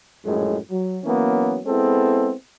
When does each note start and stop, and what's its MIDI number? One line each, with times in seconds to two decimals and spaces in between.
0.24 0.56 34
0.24 0.56 42
0.24 0.56 45
0.24 0.56 56
0.70 0.97 54
1.03 1.59 52
1.03 1.59 54
1.03 1.59 58
1.03 1.59 59
1.03 1.59 61
1.66 2.31 56
1.66 2.31 59
1.66 2.31 60
1.66 2.31 64
1.66 2.31 68
1.66 2.31 69